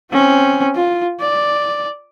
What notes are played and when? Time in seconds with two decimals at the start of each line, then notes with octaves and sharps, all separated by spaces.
0.11 C4 C#4
0.75 F4
1.20 D5